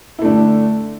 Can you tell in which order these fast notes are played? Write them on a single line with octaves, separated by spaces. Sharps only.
E4 A3 D4 D3